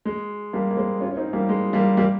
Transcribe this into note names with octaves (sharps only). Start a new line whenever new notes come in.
G#3
G3 A#3
A#3
G#3 C4
C#4 F4
C#4
C4 D#4
G3 A#3
G#3
G3 A#3
G3 A#3